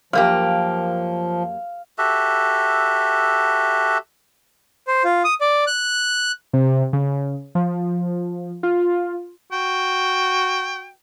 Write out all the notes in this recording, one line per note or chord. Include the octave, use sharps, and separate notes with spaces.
F#2 F3 A#3 G4 F5
F#4 G4 A4 E5
C5
F4
D#6
D5
F#6
C3
C#3
F3
F4
F#4 G5